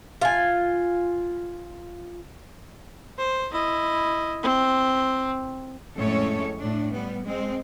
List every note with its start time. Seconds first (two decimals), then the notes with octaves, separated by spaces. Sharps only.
0.21 F4 G#5
3.18 C5
3.52 E4 D#5
4.43 C4
5.96 F2 A2 G#3 C#4 A4 C#5
6.59 A2 D4
6.88 G3 B3
7.24 G#3 C4